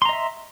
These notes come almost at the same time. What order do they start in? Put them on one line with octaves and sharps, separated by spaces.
C6 A#5 D#5 E5